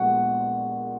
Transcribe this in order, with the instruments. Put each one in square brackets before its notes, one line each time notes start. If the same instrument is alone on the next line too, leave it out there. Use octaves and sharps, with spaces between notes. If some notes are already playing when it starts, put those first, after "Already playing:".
Already playing: [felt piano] A#1 A#2 G#3 B3 F#5 C#6